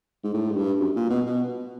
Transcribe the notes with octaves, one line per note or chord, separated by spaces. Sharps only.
G#2
A2
G#2
G2
F#2
A#2
B2
B2